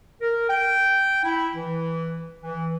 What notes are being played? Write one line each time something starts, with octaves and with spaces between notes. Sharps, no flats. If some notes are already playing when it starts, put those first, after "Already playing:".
A#4
G5
E4
E3
E3